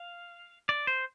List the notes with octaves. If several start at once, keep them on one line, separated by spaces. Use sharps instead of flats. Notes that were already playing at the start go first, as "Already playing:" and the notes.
Already playing: F5
D5
C5